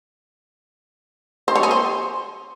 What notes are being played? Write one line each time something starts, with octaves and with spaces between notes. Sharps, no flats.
C5
C#5
G#4
C5